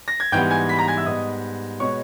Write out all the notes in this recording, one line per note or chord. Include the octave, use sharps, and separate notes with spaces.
A#6
G#6
G#2 E3 G3 B3 G5 G6
G#5 G#6
B5 B6
A#5 A#6
G#5 G#6
E5 E6
G#2 G3 B3 D#5 D#6
B2 G#3 B3 C#5 C#6